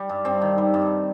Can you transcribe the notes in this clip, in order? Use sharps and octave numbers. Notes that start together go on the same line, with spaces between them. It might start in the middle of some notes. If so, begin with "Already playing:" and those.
Already playing: G3
G2
G2 C4
D#3
G3
G2